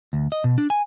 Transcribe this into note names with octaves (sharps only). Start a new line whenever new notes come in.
D2
D#5
B2
D4
G#5